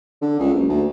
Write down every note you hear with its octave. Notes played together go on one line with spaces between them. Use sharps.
D3
C#2
F#1
D2